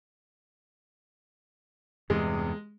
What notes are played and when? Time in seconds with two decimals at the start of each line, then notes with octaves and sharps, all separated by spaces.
2.10 E2 G2 C3 G#3